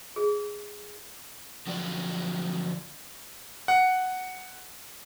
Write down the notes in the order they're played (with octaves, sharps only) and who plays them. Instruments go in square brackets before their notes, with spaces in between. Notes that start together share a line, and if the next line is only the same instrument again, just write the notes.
[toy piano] G#4
[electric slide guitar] D3 F3 F#3 F4 D5
[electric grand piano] F#5